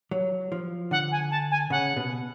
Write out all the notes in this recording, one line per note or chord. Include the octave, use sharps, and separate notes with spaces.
F#3
F3
D3 F#5
G#5
A5
G#5
C#3 F#5
B2